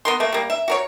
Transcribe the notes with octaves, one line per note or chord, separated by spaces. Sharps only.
B3 A#4 C6
A3 A#3
G3 A#3
E5
F#4 A#4 C#5